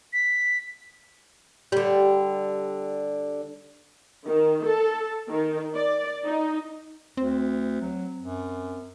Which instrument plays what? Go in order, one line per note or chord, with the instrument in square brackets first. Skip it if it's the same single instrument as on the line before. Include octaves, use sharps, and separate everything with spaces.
[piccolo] B6
[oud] D3 G3
[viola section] D#3
A4
D#3
D5
D#4
[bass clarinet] D2 [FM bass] C4
[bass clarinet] F#3
F#2